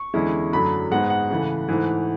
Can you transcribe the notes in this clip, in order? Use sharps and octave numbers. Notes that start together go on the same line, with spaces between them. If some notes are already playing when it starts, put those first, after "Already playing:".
Already playing: C#6
E2 D3 G#3 C#4 E4
F#2 D3 F#3 A3 B5
G#2 G#3 B3 F#5
F#5
C#3 E3 A3
G#2 E3 A3